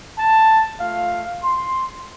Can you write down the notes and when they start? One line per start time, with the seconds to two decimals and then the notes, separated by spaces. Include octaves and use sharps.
0.18 A5
0.80 A3 F4 F5
1.43 C6